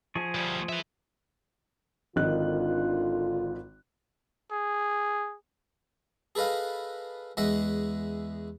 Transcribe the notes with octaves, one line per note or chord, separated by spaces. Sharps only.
F3 G#4 C#6
D2 G3
B4 E5
G#1 D3 D#3 F4 F#6
G#4
G#4 A4 B4 D#5 F5
E2 G#3 D#5 E5 F#5